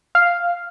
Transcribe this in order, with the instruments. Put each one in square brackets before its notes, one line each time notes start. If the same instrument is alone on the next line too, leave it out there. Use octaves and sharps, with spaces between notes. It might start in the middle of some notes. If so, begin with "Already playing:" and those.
[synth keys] F5